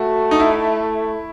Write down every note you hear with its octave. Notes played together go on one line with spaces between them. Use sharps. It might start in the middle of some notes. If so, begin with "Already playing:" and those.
Already playing: A3 F#4
D#4
E4